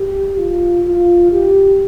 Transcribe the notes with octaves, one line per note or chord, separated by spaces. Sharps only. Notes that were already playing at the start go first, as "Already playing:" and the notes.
Already playing: G4
F4
F4
G4